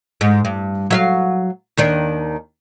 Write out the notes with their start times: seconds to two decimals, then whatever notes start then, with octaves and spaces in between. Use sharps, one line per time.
0.21 G#2
0.45 G2
0.91 F#3 E5 F5
1.77 D#2 D#3 D4